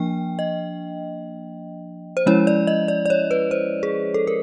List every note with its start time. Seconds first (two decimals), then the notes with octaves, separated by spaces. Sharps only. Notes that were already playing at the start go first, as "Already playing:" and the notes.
Already playing: F3 A#3 D4 G5
0.39 D#5
2.17 C5
2.26 F3 G#3 C#4 E4 C#5
2.47 D5
2.67 D#5
2.88 D5
3.06 D5
3.10 C#5
3.31 B4
3.51 C5
3.83 G#4
4.14 A4
4.27 A#4